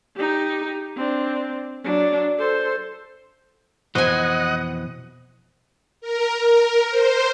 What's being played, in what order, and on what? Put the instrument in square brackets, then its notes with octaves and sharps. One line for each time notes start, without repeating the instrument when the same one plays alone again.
[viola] D#4 G4
C4 D4
F#3 D4
A4 C5
[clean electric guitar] F2 B2 E3 [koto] C5 G#5 [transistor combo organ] D#5 F#5
[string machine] A#4
A#4
C5